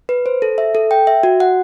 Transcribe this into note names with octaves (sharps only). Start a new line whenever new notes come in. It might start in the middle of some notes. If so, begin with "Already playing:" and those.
B4
C5
A4
E5
A4
G5
E5
F#4
F#5